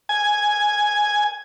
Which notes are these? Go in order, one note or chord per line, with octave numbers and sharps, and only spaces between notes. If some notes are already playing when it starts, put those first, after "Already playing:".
G#5